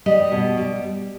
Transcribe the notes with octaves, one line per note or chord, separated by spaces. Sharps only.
G3 D#5
B2
G3